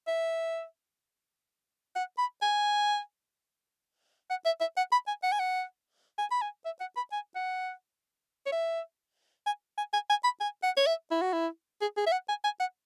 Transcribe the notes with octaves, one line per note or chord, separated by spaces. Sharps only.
E5
F#5
B5
G#5
F#5
E5
E5
F#5
B5
G#5
F#5
G#5
F#5
G#5
B5
G#5
E5
F#5
B5
G#5
F#5
C#5
E5
G#5
G#5
G#5
G#5
B5
G#5
F#5
C#5
E5
E4
F#4
E4
G#4
G#4
E5
F#5
G#5
G#5
F#5